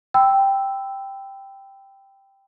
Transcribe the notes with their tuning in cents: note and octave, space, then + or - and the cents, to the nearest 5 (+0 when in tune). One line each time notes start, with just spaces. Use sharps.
G5 +0 B5 +35 E6 +0